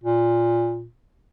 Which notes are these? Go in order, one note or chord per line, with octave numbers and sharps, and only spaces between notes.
A#2